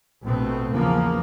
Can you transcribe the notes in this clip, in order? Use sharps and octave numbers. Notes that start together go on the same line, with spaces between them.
A#1 B2 A3 B3 C4
E2 C#3 F3 A#3 B3